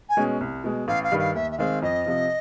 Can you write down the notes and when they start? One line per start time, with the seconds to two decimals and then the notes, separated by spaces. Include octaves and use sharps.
0.09 G#5
0.17 B2 G#3 C#4
0.41 C2
0.64 B2 G#3
0.88 A1 F5
1.03 F5
1.11 G2 D#3 G3
1.19 F5
1.35 D#2 E5
1.51 E5
1.58 D#3 G#3 C4 F5
1.82 F2 D#5
2.06 C3 F3